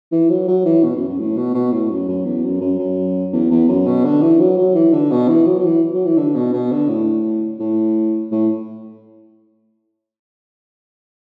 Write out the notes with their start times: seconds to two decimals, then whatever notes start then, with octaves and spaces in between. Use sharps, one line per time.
0.12 E3
0.30 F#3
0.48 F#3
0.65 E3
0.83 B2
0.95 F#2
1.08 F#2
1.19 A2
1.37 B2
1.54 B2
1.72 A2
1.90 F#2
2.08 F#2
2.25 E2
2.44 F#2
2.61 F#2
2.79 F#2
3.33 E2
3.51 E2
3.69 F#2
3.87 B2
4.04 D3
4.22 E3
4.40 F#3
4.58 F#3
4.74 E3
4.93 D3
5.11 B2
5.28 E3
5.46 F#3
5.58 F#3
5.65 E3
5.94 F#3
6.05 E3
6.17 D3
6.35 B2
6.53 B2
6.71 D3
6.89 A2
7.59 A2
8.32 A2